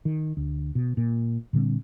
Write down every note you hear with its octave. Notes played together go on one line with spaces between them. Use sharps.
D#3
D2
B2
A#2
A#2 D3 G3 C4